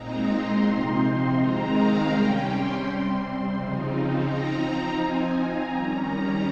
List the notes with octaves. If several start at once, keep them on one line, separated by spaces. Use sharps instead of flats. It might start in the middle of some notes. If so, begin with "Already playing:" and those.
Already playing: A#2 G#3 C4 D#4 A#5
C6
C3 F3 C4 D#4 C6
D#3 G#3 C4 D#4 A#5
F5
C3 G3 C#4 G5
C6
C3 G3 C4
C#3 F3 C4 D#4
F3 C4 D#4 A#5
F3 C4 D#4 G#5
A#5
D#3 G3 C#4
A#5